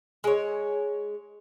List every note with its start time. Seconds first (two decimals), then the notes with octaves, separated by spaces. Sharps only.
0.24 G#3 C#5